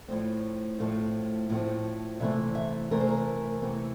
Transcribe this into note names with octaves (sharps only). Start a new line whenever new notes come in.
A2 F3 A3 C4
A2 F3 A3 C4
A2 F3 A3 C4
C3 E3 A3 C4 E5
E5
C3 E3 A3 C4 A#4
C5
A#4
C3 E3 A3 C4